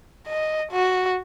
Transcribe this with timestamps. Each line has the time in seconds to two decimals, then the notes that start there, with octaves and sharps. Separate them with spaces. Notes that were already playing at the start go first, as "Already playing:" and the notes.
0.28 D#5
0.73 F#4